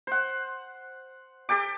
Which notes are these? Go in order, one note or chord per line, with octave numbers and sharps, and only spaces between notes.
C5 F#5
G4 A4 G5 D6